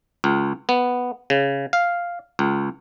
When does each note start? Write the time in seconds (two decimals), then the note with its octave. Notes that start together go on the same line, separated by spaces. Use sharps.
0.24 C#2
0.69 B3
1.30 C#3
1.73 F5
2.39 C#2